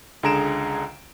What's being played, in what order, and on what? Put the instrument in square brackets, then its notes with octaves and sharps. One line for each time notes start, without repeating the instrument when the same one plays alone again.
[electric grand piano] C#2 D3 G#4 A#5 D7 E7